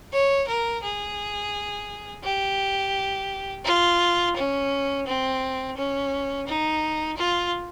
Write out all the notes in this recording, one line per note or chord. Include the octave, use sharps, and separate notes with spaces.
C#5
A#4
G#4
G4
F4
C#4
C4
C#4
D#4
F4